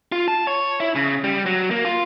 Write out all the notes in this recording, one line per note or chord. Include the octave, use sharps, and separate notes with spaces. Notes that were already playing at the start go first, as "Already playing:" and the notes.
F4
A5
C#5
E4
C#3
G3
F#3
A#3
F4